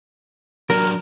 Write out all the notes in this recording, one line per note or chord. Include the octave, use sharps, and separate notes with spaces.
F#3 D4 A#4